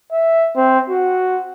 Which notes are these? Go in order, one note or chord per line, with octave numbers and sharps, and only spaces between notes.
E5
C4
F#4